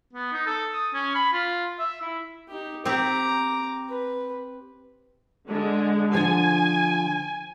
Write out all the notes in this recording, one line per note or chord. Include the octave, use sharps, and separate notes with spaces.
B3
D#4
A4
D#6
C#4
B5
F4
E5
E4
D#4 G4
C4 G4 A#5 D6
B4
D3 G#3
D3 F3 G#5